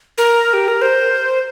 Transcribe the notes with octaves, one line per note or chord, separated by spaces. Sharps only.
A#4
G4
A#4
C5